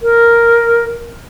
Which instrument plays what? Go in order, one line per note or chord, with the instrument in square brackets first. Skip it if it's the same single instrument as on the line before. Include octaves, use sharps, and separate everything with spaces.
[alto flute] A#4